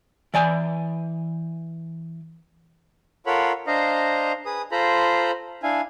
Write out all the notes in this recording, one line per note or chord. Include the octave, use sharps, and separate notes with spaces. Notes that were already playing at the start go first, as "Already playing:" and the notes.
E3 D5 G#5
F4 A4 A#4 C#5 F#5 B5
D4 C5 D#5 F5 A#5
G#4 B4 D#6
F4 A4 C5 A#5 B5
D4 E4 F5 G#5